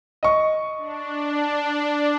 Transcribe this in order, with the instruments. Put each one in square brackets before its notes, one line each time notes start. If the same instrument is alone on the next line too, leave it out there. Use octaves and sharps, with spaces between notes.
[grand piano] D#5 C#6
[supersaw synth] D4